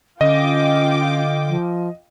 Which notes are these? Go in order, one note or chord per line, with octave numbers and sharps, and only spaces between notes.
D3 C#4 F4 D#5 G5 D6
F3